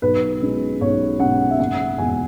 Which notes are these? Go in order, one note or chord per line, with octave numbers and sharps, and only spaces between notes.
B1 B4
B2 G#3 C#4
B1 C#5
B2 G#3 C#4 F#5
E5
F#1 F#5
E2 B2 G#3 G#5